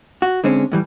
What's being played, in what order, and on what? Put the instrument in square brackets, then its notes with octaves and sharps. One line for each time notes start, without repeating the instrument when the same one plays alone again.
[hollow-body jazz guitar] F#4
D3 G#3 C4 C#4
A2 E3 G3